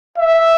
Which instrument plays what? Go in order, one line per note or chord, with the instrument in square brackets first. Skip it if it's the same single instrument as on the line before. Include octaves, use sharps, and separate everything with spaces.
[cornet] E5